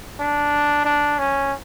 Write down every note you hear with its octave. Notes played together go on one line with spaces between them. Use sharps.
D4
D4
C#4